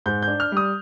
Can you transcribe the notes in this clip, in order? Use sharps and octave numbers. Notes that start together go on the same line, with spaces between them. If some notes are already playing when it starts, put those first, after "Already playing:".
G#2 G6
G6
D4
F6
G3 D#6